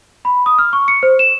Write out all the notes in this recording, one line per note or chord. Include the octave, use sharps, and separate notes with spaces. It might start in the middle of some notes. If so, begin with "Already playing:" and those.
B5
D#6
F6
C#6
C#7
C5
E7